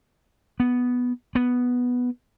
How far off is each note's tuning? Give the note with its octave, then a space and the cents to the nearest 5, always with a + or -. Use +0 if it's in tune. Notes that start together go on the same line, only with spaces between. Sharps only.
B3 +0
B3 +0